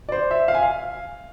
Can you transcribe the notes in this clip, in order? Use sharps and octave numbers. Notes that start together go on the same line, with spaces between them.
D5
C5
E5
F5
G#5
F5